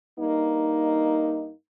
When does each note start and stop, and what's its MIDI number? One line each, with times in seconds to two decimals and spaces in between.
0.19 1.51 43
0.19 1.51 58
0.19 1.51 63